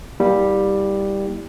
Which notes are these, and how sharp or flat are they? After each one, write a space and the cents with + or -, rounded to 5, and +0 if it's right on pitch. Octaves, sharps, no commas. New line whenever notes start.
G3 +5 A#3 +25 E4 -35